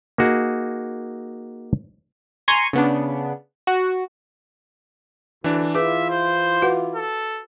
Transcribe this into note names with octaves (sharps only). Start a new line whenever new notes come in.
A#3 D#4 F#4 G#4
G#5 A#5 C6 C#6 G#6
C#3 B3 D4
F#4
D2 E3 D4
E3 E4 F4 G#4 B4 E5 D6
C5
F#4 B4 F#5
A4